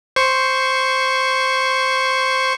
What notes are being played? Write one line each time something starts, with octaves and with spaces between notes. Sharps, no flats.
C5 C#6